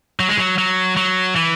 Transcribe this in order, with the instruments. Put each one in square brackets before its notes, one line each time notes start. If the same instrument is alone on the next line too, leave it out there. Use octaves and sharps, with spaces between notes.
[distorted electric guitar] F#3
G#3
F#3
F#3
F#3
E3